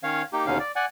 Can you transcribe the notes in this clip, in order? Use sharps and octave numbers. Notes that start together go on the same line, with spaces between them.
D#3 C#4 C#5 F5
A#3 D#4 G4
D#2 B2 D3 C#4 D#4 F5
D5
D5 F#5 G#5